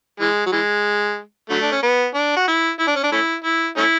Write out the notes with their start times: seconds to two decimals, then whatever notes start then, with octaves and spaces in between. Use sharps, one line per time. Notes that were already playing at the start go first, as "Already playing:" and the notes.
0.20 E3 G#3
0.47 F#3
0.52 E3 G#3
1.50 D3 F#3 A3
1.62 D4
1.72 C#4
1.83 B3
2.15 D4
2.36 F#4
2.48 E4
2.80 E4
2.87 D4
2.96 C#4
3.03 D4
3.12 A3 C#4 E4
3.45 E4
3.77 A3 C#4 E4